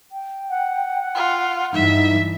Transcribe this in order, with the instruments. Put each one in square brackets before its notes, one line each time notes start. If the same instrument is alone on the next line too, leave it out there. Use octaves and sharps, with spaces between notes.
[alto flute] G5
[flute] F#5
[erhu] F4
[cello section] G2 E3 [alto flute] D#4 [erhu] E5